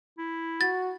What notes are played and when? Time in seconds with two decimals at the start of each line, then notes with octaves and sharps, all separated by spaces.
0.18 E4
0.61 F#4 A6